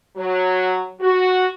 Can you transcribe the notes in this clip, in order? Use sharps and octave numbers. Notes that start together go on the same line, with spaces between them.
F#3
F#4